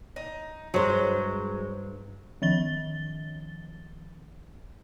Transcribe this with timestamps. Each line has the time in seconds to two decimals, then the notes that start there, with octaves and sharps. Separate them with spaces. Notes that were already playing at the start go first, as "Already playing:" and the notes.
0.16 D#4
0.74 G2 F#3 G#3 C5
2.42 D#3 F3 A6 G7